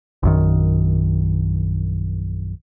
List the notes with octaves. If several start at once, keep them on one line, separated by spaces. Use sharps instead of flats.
A#1 F#2 D#3